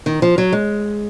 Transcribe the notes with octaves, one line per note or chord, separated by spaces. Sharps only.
D#3
F3
F#3
G#3